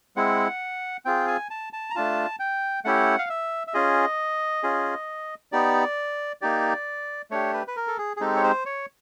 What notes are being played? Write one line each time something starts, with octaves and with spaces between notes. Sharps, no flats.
G#3 C4 E4 F#5
C4 F4 G#4 G5
G#5
A5
A5
A#5
A3 D4 F4 A5
G5
A3 C#4 E4 G4 F#5
F5
E5
E5
C#4 F4 G#4 D#5
C#4 F4 G#4
B3 D#4 G4 D5
A#3 D#4 G4 D5
A3 D4 G4 C#5
B4
B4
A#4
A4
G#4
G#4
G#3 C4 D#4 G4 A4
C#5
C5
C#5